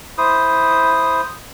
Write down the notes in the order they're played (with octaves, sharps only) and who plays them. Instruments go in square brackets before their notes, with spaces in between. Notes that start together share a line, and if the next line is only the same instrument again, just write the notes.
[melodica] E4 C5 D#6